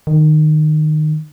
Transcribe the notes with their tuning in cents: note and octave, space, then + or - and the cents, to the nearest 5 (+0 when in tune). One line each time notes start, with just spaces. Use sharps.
D#3 -20